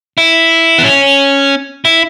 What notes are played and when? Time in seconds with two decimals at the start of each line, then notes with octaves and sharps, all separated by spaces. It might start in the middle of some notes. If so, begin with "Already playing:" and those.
0.18 E4
0.78 B3
0.84 C#4
1.85 E4